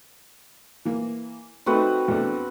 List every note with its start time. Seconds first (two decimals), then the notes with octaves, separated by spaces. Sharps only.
0.85 E3 A#3
1.66 A3 C4 D#4 F#4 B4
2.08 E2 A3 D4